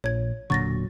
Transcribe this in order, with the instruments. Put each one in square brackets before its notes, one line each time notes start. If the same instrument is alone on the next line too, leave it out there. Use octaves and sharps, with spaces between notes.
[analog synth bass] A#1 [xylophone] C#5 G#6
[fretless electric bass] E1 A#2 D3 [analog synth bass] F#3 [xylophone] C#6 A6 A#6